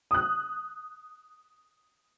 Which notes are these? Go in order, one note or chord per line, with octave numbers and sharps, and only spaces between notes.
D#6 F#6